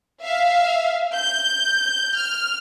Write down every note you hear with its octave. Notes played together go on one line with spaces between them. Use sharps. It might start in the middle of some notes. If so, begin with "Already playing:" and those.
E5 F5
G6
F6